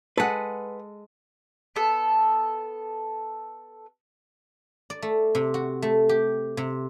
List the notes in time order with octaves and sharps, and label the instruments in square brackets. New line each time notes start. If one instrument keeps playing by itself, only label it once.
[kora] G#3 A4 [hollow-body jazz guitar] B4 F#5
[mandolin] B3 A4
[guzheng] D5
A3
C3
F#4
A3
G4
C3